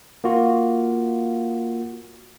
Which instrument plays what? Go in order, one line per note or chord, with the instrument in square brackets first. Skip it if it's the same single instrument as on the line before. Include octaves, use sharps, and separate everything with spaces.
[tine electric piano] A#3 F4 F#4